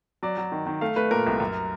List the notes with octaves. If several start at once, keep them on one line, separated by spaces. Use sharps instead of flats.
F#3 D5
F#3
D#3
D#3
A3 F5
A3 B4
A#2 A#4
C2
F#2